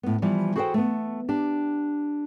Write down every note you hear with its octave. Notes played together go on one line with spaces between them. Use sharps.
A2 B3
E3 F3 G3
F#4 G#4 A4 B4 C5 G5
A3 B3
D4 G4